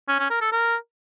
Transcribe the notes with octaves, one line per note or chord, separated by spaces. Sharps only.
C#4
C#4
A#4
A4
A#4